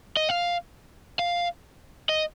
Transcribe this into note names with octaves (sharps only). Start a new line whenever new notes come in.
D#5
F5
F5
D#5